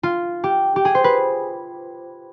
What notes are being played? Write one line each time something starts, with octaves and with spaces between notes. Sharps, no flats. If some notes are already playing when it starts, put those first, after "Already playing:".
F4
G4
G4
G#4
C5
B4